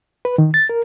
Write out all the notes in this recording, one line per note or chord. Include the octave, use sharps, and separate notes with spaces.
B4
D#3
A6
A#4